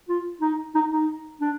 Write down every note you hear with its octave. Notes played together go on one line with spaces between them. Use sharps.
F4
D#4
D#4
D#4
D4